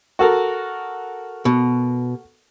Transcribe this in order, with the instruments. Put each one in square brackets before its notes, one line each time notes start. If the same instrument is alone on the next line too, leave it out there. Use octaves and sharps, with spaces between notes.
[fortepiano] F#4 A4 A#4
[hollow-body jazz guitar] B2